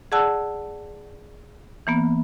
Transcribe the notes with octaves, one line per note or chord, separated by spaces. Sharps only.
G#4 D5 F#5 A5 E6 F#6
E3 A#3 B3